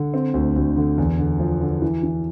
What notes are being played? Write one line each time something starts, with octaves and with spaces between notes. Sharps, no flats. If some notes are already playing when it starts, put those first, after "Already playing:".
Already playing: D3
C4
D2
D2
D3
E2
D3
F3
D3
E3
E3